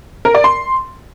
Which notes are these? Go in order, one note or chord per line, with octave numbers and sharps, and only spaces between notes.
A#4
D5
C6